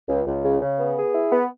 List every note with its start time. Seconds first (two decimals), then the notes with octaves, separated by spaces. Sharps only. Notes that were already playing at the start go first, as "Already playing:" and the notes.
0.08 C#2
0.27 C#2
0.44 C#3
0.62 C#3
0.79 B3
0.97 G#4
1.15 E4
1.32 B3